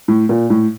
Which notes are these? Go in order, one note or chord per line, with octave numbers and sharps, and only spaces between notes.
A2
A#2
A2